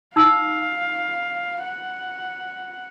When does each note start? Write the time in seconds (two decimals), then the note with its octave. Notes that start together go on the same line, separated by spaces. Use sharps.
0.16 D#4 F5 E6
1.63 F#5